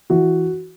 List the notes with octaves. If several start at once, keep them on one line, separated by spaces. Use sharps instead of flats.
E3 F#4